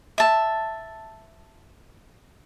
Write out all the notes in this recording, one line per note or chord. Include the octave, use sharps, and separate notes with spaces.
E5 A5